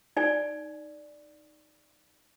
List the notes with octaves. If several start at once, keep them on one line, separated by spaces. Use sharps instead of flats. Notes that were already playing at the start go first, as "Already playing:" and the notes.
D#4 D5 G#5